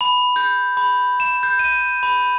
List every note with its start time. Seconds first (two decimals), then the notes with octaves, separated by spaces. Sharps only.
0.01 B5
0.36 G6
0.77 B5
1.20 E7
1.43 G6
1.59 D#7
2.03 B5